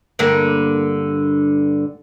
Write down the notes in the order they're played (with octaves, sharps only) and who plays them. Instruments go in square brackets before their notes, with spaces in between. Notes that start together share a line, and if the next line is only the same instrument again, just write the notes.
[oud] G2 D3 A#3